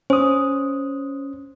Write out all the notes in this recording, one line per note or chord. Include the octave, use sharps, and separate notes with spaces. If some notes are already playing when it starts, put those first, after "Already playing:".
C#4 C5 D#6